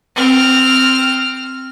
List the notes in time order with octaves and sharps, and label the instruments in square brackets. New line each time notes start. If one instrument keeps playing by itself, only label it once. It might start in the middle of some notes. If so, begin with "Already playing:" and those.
[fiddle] C4 F6